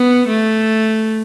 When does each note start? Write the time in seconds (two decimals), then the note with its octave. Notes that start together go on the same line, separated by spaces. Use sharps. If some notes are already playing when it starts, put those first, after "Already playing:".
Already playing: B3
0.28 A3